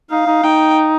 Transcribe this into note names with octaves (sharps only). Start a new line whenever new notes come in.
D#4 F5
D#4
D#4 G5